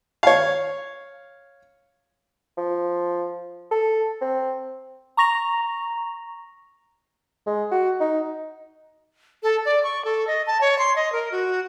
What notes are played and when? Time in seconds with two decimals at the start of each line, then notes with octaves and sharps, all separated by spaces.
0.23 C#5 F5
2.57 F3
3.71 A4
4.21 C4
5.17 A#5 C#6 A#6 F7
7.47 G#3
7.71 F#4
8.00 D#4
9.43 A4
9.65 D5
9.83 C#6
10.05 A4
10.27 D#5
10.47 A5
10.61 C#5
10.79 C6
10.96 D#5
11.12 A#4
11.32 F#4